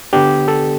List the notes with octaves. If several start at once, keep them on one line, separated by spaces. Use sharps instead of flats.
D3 B3 D4 G4
A4